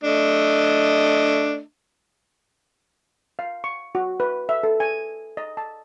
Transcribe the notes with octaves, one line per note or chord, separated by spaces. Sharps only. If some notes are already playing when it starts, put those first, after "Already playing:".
A3 D4 D#5
F5
C#6
F#4
B4
E5
A4
G#5
D#5
A5